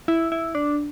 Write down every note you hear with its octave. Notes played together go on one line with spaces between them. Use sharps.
E4
E4
D4